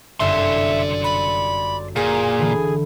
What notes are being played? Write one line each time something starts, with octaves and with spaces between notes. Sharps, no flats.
G1 F#2 D5 E5 C6
B5
A#2 G#4
D3 E3